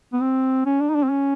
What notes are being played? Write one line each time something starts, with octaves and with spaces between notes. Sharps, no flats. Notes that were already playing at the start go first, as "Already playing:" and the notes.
B3
C4
C#4
D4
D#4
D4
C4
C#4